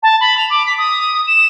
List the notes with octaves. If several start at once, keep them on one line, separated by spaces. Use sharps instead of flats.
A5
B5
F7
D6
B6
D#6
E7